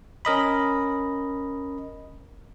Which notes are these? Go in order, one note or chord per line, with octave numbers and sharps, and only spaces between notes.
C#4 A#4 D#5 B5